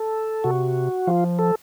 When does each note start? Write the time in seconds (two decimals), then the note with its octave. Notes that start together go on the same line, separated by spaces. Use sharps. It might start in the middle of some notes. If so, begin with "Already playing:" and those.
Already playing: A4
0.44 C3 F#4
1.07 F3 F4
1.39 A4